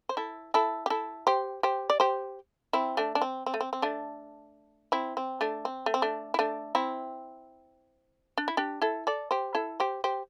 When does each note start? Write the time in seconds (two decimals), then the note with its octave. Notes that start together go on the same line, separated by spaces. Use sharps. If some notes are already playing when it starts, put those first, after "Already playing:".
0.09 C5
0.17 E4 A4
0.54 E4 A4
0.86 G4
0.90 E4 A4
1.27 G4 C5
1.63 G4 C5
1.90 D5
2.00 G4 C5
2.73 C4 E4
2.97 A3 D4
3.15 D4
3.21 C4
3.46 C4
3.54 A3
3.61 C4
3.73 C4
3.82 A3 D4
4.92 C4 E4
5.17 C4
5.41 A3 D4
5.65 C4
5.86 A3
5.94 C4
6.02 A3 D4
6.34 E4
6.39 A3 D4
6.75 C4 E4
8.38 D4
8.48 E4
8.57 D4 G4
8.82 E4 A4
9.07 A4 D5
9.31 G4 C5
9.55 E4 A4
9.80 G4 C5
10.04 G4 C5